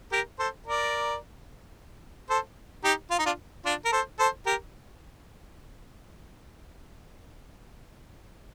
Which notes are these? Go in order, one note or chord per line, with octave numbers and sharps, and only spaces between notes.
G4 A#4
A4 C5
A#4 D5
A4 C5
D#4 G4
F4
D#4
D4 F4
D4 F4
A#4
A4 C5
A4 C5
G4 A#4